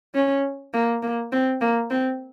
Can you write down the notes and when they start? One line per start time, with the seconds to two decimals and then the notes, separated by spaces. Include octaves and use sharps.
0.15 C#4
0.74 A#3
1.02 A#3
1.32 C4
1.61 A#3
1.91 C4